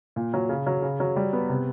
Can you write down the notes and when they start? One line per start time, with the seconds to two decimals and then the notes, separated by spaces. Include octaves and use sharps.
0.16 A#2
0.34 F#3
0.49 C#3
0.67 F#3
0.82 C#3
1.00 F#3
1.16 G3
1.33 B3
1.49 C3